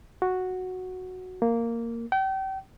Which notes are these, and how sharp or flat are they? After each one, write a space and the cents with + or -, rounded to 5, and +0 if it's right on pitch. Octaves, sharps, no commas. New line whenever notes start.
F#4 -5
A#3 -10
G5 -35